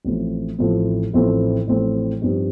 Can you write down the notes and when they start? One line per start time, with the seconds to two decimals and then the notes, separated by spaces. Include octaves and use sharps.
0.05 A1 A2 F3 A3 C4
0.58 A1 A2 F3 A3 C4
1.13 A1 A2 F3 A3 C4
1.68 A1 A2 F3 A3 C4
2.22 G2 F3 C4 D#4 G4